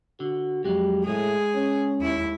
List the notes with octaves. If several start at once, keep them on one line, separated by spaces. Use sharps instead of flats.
D3 F#4
F2 F#3 G#3 G4
A2 G#3 G#4
C#4
D#2 E4